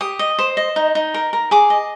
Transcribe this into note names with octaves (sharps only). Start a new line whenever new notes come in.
G4 D#6
D#5
C5
D#5
D#4
D#4
A#4
A#4
G#4 D6
D#5